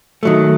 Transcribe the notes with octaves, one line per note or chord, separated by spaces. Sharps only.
D#3 F#3 A3